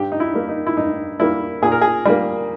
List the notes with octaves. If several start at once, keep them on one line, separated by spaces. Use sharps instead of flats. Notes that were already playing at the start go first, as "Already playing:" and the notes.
Already playing: G2 G4
D#4
E4
G3 A#3
D#4
E4
G2 D#4
G3 A#3 E4
A#2 G#4
A#4
G#4
G3 A#3